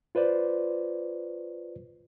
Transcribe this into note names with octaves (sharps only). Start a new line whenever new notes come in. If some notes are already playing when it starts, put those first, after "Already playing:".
F4 B4 C5 D5